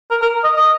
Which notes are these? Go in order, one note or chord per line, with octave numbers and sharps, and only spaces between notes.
A#4
A#4
D#5
D#5